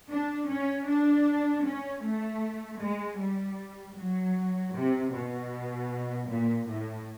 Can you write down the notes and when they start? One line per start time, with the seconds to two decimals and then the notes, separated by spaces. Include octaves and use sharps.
0.10 D4
0.50 C#4
0.88 D4
1.65 C#4
2.04 A3
2.81 G#3
3.19 G3
3.97 F#3
4.74 C3
5.13 B2
6.29 A#2
6.68 A2